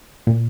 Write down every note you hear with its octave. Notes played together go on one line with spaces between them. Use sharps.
A#2